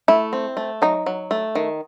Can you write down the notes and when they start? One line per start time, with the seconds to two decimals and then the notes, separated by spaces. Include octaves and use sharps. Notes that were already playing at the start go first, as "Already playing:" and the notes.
0.08 A3 E4
0.33 C4
0.57 A3
0.82 F#3 D#4
1.06 F#3
1.31 A3
1.55 D#3